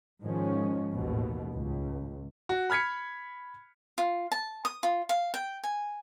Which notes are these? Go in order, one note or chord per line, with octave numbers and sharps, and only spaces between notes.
G#2 D#3 F3 G#3 C#4
A1 D#2 G#2 B2
C#2
F#4
B5 F6 G#6 B6 C#7
F4
A5
D#6
F4
F5
G5
G#5